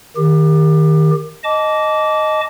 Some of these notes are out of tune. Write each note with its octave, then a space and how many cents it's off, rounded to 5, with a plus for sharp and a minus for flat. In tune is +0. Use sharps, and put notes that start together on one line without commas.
D#3 +0 G4 +25
D#5 +0 A5 -20 D6 -20